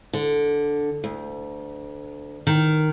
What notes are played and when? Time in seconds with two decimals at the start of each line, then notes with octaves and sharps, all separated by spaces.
0.13 D3
1.04 D2
2.47 D#3